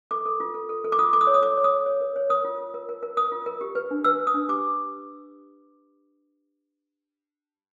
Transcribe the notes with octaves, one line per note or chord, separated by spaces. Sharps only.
A4 D6
A4
F4
A4
A4
A4
D6
F4 D#6
A4 D6
D#6
C#5
D#6
A4 D6
C#5
D#6
C#5
C#5
A#4
C#5
A#4 D#6
F4
F4
A#4
A#4
A#4
A#4 D#6
F4
A#4
G4
B4
D4
B4 E6
B4
D#6
D4
G4 D6